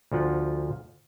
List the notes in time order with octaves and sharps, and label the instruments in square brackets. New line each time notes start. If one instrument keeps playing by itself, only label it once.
[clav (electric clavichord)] D2 F3 F4 F#5